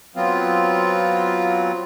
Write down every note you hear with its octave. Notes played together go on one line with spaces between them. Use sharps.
F#3 B3 C4 F4